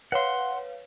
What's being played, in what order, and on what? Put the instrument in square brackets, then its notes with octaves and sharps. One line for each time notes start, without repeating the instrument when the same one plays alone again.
[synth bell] B4 C#5 F5 [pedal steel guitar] F#5 C6